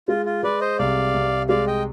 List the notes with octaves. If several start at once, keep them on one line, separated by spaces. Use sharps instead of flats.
G#3 F4
F4
G#3 B4 D5
C5 D#5
C2 D5 F5
C2
G#3 D5 F5
D#5 G5